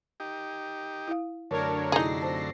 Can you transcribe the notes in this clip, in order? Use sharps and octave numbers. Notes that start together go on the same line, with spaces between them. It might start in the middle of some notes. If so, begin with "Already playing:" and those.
D#4 G4
E4 F5
F#2 D3 A3 D4 A#4 C#5
C3 D#4 E4 G#4 A#5 A#6 C7
C5 A5